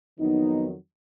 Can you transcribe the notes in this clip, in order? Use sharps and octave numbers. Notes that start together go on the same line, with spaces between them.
F2 D#3 F#3 B3 D#4